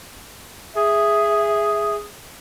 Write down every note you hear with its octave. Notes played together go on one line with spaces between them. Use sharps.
G#4 E5